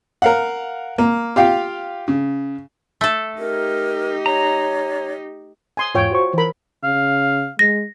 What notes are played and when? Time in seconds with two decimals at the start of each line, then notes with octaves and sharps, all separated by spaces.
0.22 A#4 F5 F#5
0.98 A#3
1.36 F4 G4 F5 G5
2.08 C#3
3.01 A3 A4
3.39 D#4 G4 A#4
4.26 C#5 A#5
5.77 G#5 C6 D#6
5.95 E2 G#2 F4 C#5 G5
6.11 F#4 C5 C#6
6.34 E3 A#4 C5 B5
6.83 C#3 F5
7.59 G#3 A#6